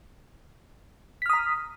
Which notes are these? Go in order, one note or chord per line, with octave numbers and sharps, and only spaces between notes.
A#5 D#6 F6 B6